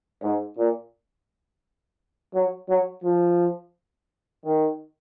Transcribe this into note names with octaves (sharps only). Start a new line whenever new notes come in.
G#2
A#2
F#3
F#3
F3
D#3